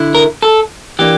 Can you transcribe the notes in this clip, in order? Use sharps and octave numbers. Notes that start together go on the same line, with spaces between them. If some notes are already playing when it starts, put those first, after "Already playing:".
Already playing: D3 E4
A#4
A4
E3 A#3 D4 G4